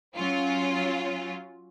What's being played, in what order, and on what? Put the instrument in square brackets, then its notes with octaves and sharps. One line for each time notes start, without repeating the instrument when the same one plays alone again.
[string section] F#3 C#4 F4